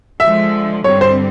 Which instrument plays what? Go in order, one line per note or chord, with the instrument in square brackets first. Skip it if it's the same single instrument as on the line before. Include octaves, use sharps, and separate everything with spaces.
[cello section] D3 F3 G#3 [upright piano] E5
[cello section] G2 D3 G3 C4 [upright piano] C#5
[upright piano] C5